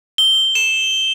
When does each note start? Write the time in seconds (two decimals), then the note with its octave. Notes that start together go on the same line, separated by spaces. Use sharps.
0.18 G7
0.55 E7